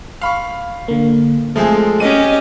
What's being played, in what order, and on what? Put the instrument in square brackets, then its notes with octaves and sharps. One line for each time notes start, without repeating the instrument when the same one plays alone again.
[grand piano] F5 B5 C#6
[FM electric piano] D3 A#3
[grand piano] F3 G#3 C4 [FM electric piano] A3 G#4
[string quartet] C#4 G4 D#5 [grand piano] D#7